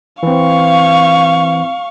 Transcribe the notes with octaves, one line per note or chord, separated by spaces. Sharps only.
E3 C4 F5 C#6